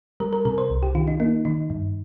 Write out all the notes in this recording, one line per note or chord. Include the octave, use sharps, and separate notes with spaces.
G3 A#4
A#4
C3 A#4
C5
C2
G4
D#3 F4
D#4
A#3 D#4
D#3 D#4
G2